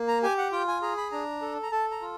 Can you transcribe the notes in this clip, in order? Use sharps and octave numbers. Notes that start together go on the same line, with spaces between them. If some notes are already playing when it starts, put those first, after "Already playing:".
Already playing: A#3
A#5
G4 G#5
F#5
F4 G5
G#5
G#4 A#5
B5
D4 A#5
A4
A#5
A4 A5
A#5
F4